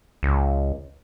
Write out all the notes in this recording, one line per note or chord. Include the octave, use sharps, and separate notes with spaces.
C#2